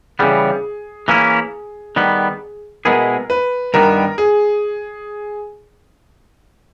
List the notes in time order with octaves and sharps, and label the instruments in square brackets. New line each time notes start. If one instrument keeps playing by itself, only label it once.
[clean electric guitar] C#3 E3 G3 B3 [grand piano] G#4
[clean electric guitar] E3 A#3 C#4 E4
D#3 G3 B3
[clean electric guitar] B2 G#3 B3 E4 G#4 [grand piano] A#4
[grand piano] B4
[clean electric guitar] G2 D#3 G3 B3 [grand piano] A#4
[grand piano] G#4